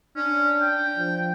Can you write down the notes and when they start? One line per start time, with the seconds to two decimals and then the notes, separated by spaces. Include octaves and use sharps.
0.16 C#4 D4
0.61 G5
0.97 F3